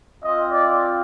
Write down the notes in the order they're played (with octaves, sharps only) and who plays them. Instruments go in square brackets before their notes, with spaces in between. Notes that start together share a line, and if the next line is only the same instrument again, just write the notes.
[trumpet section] C4 F4 D#5
D5